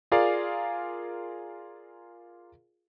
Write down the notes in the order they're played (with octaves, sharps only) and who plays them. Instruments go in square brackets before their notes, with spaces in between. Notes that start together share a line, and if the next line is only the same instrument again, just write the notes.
[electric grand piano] F4 G#4 A#4 D5 F5